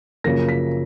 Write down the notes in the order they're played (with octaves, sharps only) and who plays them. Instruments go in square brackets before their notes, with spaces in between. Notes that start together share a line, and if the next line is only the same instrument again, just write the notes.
[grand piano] F#2 C#3 F3 A#3 A#6
B6